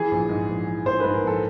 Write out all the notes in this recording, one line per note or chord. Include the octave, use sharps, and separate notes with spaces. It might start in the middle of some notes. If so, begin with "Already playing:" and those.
Already playing: E3 G#4
A#1
G#2
A#1
E3
A#1 C5
G#2 B4
A#4
A#1 A4